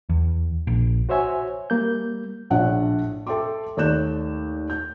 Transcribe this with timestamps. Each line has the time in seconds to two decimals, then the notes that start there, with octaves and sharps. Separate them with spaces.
0.09 E2
0.67 A#1
1.09 F#4 C5 C#5 E5 G#5
1.70 G3 A#3 G6
2.50 A#1 A2 D4 E4 F#5
3.27 A4 E5 G5 C6 D6
3.77 D#2 A3 D5 F#6 G6 E7
4.70 G6